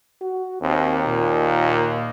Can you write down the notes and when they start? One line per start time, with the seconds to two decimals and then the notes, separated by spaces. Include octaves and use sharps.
0.21 F#4
0.62 D#2 C4
1.06 A#2